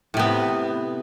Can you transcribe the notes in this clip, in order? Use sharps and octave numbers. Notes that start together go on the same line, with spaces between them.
A2 C3 B3